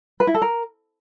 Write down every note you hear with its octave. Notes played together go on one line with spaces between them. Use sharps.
B4
E4
A4
A#4